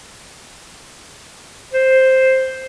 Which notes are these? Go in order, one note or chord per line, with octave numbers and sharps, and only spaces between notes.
C5